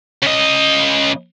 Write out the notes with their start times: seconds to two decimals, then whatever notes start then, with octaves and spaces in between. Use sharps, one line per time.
0.23 C#3 D#5